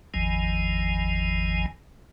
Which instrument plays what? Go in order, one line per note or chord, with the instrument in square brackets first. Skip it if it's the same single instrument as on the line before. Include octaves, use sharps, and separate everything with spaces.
[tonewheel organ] G#1 E2 D#3 F3 G#5